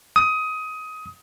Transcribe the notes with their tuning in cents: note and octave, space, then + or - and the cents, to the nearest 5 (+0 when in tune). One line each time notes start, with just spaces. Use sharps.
D#6 +20